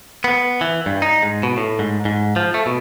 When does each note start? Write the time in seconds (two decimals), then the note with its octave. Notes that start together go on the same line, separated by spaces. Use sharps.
0.24 B3
0.61 E3
0.86 G2
1.02 D#4
1.22 G#2
1.43 B2
1.57 A2
1.79 G#2
2.05 G#2
2.36 F3
2.54 A3
2.66 B2